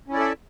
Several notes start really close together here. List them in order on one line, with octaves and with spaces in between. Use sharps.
C#4 E4 D5 A4 E5